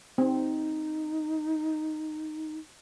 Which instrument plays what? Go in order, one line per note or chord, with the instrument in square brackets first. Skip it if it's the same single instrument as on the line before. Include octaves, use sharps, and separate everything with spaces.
[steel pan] C4 [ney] D#4